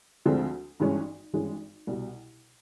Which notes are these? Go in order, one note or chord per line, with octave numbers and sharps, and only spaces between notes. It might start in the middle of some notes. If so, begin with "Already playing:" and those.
D2 D3 F3 G#3 C4
G#1 G2 E3 G#3 C#4
G#1 G2 E3 G#3 C#4
C2 B2 G3